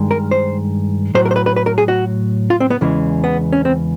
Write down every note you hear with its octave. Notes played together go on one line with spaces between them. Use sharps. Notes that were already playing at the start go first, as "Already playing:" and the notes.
Already playing: G2 D#3 G#3
A#4
C5
A2 F#3 C5
A#4
C5
B4
B4
B4
A#4
G#4
F#4
F4
C4
B3
E2 C#3 E3 G#3
B3
C#4
C4